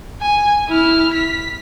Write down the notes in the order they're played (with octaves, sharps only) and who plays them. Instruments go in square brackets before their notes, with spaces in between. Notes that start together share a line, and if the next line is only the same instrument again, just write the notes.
[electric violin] G#5
E4 F6
B6